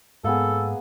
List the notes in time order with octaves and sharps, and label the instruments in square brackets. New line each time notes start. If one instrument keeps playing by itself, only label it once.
[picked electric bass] G#2 [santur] A#3 B3 G#4 [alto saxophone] A4